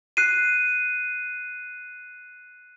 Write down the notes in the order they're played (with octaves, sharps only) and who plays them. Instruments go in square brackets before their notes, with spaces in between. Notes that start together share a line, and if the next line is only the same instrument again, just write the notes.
[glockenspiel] F#6 C7 D#7